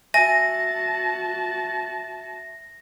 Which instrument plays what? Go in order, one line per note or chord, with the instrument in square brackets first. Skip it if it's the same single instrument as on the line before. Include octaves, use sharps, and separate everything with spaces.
[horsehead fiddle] F#4 A5 [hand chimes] E5 [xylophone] G#5 [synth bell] A#6